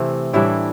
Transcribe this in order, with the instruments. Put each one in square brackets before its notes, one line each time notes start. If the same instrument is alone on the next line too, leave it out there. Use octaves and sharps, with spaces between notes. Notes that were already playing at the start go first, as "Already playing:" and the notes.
Already playing: [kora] C3 E3 A3 C4
A2 E3 G3 D4 E4